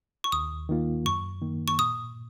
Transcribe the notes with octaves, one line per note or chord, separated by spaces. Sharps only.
C#6
D#2 D#6
D#3 A#3 F4
F#2 C#6
D#3 A#3
C#6
A#2 D#6